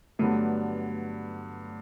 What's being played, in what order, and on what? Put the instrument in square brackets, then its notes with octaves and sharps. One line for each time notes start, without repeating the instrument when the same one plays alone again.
[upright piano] G2 D3 F#3 B3 D4 [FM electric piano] A3